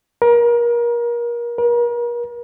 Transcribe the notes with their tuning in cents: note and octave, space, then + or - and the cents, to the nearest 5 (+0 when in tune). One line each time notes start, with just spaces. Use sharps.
A#4 +30
A#4 +40